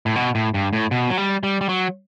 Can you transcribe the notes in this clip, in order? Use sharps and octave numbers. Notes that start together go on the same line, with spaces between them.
A2
B2
A2
G2
A2
B2
F#3
G3
G3
G3
F#3